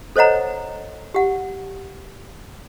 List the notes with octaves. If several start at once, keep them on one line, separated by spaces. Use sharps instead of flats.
A4 C5 C#5 D#5 F#5 A#5
G4 F#5